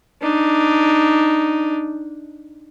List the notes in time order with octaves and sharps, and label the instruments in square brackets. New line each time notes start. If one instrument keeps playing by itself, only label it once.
[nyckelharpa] D4 D#4